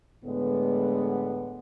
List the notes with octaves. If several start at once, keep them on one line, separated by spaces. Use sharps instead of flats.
A2 D3 G#3 B3